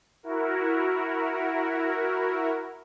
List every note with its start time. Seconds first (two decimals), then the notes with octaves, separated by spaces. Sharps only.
0.23 E4 F#4 A#4